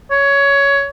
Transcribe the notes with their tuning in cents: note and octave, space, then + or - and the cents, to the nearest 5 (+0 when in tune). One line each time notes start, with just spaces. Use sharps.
C#5 +15